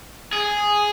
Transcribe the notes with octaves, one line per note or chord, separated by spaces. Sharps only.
G#4